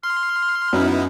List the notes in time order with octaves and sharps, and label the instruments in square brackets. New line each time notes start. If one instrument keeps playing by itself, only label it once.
[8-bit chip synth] C6 [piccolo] F6
[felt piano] F#2 [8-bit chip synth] B3 D#4 E4